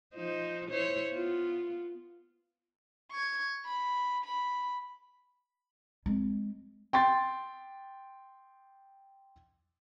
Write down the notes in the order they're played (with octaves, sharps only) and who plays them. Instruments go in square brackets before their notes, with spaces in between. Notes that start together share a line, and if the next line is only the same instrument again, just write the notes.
[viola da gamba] F3 D#4 C5
E4 C5 C#5
B3 F4
[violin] C#6 G#6
B5
B5
[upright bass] G#3 C4
[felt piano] G5 C6 A6